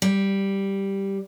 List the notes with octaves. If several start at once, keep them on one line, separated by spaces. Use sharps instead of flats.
G3